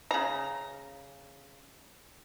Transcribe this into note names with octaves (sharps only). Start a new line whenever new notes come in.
C#3 A#5